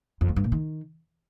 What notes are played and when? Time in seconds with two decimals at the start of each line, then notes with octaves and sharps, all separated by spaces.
0.21 F2
0.29 F3
0.36 G2
0.44 A#2
0.52 D#3